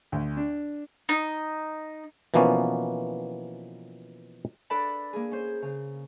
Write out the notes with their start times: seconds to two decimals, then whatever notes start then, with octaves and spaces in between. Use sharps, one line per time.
0.12 D2
0.37 D4
1.09 D#4
2.34 B2 E3 F3 A#3 B3 C#4
4.70 D4 A4 B4 D5 A5 B5
5.13 A#3 G#4
5.31 C#4 C5
5.62 C#3